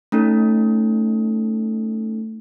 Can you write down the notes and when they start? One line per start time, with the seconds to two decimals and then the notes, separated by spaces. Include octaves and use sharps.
0.12 A3 C#4 D#4 A4